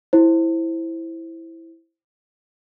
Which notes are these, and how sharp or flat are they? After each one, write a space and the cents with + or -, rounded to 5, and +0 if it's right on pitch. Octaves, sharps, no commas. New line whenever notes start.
E4 +0 C5 +10